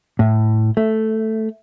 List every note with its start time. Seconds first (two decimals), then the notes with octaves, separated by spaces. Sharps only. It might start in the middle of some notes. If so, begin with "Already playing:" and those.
0.19 A2
0.77 A3